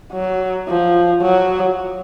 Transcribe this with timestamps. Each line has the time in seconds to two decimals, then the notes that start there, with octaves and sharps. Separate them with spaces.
0.12 F#3
0.68 F3
1.22 F#3